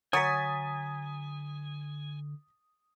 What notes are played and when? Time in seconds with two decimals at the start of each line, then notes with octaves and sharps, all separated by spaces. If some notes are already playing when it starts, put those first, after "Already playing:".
0.13 D3 F#3 G#5 D#6 A6 B6